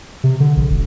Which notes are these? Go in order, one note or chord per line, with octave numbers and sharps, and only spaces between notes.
C3
D3
A#1
E1